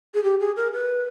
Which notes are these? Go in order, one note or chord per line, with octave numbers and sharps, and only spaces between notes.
G#4
G4
G#4
A#4
B4